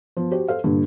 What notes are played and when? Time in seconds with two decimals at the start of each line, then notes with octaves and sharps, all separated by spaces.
0.17 F3 B3
0.31 F#4 G4 C5
0.48 A4 C5 F5
0.64 G2 A#2 D3